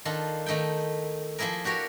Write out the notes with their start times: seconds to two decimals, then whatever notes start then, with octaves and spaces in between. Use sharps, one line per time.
0.05 D#3 D4 F4 A4
0.46 D#3 A3 D#4 E4 G5
1.38 F3 A#3 E4 G#4 A#4
1.64 D4 F#4 G4 A#4 C#5